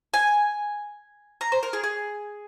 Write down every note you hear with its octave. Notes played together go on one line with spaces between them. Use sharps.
G#5
A#5
C5
A#4
G#4
G#4